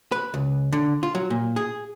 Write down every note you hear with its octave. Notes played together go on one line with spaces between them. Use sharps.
B4
C#2
D3
F4
F#3
A#2
G#4